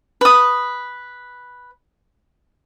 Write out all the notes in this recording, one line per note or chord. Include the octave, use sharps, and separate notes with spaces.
B4 D#6